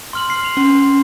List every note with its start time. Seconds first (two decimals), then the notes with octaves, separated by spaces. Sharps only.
0.13 C6 F6 F#7
0.30 C7
0.45 F7
0.57 C#4 C6